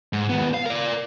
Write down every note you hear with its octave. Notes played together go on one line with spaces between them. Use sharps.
G#2
D#2 B3
F5
A#4 D5